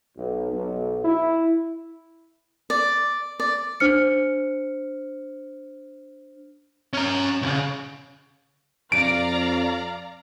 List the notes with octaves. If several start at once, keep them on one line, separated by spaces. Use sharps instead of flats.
B1
B1
E4
D5
D5
D4 C5 F6 C#7
C#4 A#5
C2 C#3
F2 D5 F5 A#5 D7